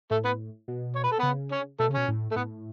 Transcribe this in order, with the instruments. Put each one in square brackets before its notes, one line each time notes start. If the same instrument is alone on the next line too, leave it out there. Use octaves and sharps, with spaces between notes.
[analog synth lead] A2 [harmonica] A3 A4
[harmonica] B3 B4
[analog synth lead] B2
[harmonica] C#5
B4
A4
[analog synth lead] C#3 [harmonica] B3 B4
[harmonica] C#4 C#5
[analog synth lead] B2 [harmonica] A3 A4
[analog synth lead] C#3
[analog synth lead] B2 [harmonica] C#4
[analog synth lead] A2
[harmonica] A3
[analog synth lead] A2 [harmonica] B3